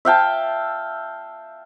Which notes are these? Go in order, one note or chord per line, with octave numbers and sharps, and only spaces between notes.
E5 F5 G5 A5